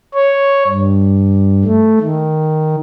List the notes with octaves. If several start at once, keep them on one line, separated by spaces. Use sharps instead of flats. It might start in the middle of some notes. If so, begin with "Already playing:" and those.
C#5
G2
A3
D#3